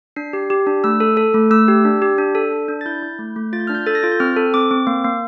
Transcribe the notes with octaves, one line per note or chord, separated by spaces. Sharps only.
D4 C7
G4
G4
D4
A3 E6
A4
A4
A3
A3 E6
G4
D4
G4
D4
A4
D4
D4
A6
E4 G6
E4
A3
A3
F4 A6
G6
D4 F6
G6
A4 A6
A#6
F4 A6
G6
C4 F6
A4
C4 D6
C4
A#3
A#3